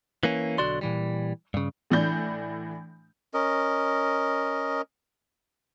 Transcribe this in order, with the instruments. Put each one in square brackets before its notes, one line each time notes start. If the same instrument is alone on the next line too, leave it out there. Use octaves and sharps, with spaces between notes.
[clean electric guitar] E3 A#3 C#4
B1 D3 F#4 D5 C6
A#2 E3 G3
G2 C#3
[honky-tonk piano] A2 E3 D4 G6
[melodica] C#4 A#4 D#5